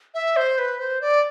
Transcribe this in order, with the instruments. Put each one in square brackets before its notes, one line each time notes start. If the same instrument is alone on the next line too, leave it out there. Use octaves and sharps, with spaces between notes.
[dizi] E5
C5
B4
C5
D5